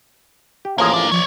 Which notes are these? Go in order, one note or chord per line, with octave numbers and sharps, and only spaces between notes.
G4
A1 F3 A#3 G#4 C#5
A#3 D4 E4
F3 C#5 D5